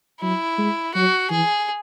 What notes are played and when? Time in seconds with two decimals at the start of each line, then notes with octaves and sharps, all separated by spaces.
0.21 F#3 E4
0.58 G#3
0.95 F#3 F#4
1.30 E3 G#4